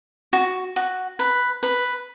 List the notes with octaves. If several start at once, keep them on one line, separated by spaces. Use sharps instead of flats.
F#4
F#4
B4
B4